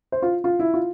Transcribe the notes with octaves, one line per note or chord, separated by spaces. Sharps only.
C5
F4
F4
E4
F4